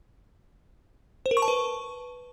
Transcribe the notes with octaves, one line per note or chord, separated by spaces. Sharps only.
C5
A#4
C#6
A5
B4